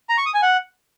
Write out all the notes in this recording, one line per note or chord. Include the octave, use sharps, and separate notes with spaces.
A#5
C#6
D#6
G#5
F#5